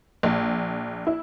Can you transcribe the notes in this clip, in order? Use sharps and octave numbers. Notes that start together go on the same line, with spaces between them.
A#1
E4